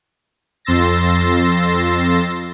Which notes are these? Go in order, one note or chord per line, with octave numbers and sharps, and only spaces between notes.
F2 C6 E6 A6 A#6